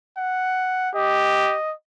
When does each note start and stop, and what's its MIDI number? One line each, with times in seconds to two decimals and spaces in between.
0.17 0.90 78
0.95 1.56 67
0.95 1.73 75